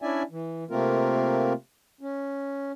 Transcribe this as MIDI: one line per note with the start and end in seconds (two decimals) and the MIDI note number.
0.02 0.23 61
0.02 0.23 62
0.02 0.23 64
0.02 0.23 74
0.02 0.23 76
0.02 0.23 80
0.31 0.64 52
0.70 1.53 48
0.70 1.53 57
0.70 1.53 58
0.70 1.53 60
0.70 1.53 65
0.70 1.53 70
2.01 2.72 61